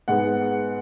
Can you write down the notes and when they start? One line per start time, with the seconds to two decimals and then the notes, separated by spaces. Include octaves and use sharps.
0.08 G#2 G#3 B3 F#5